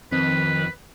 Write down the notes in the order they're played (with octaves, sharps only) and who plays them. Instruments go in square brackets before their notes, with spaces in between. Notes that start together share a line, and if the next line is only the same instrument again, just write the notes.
[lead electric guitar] F2 [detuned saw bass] D#3 [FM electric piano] C4 [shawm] B4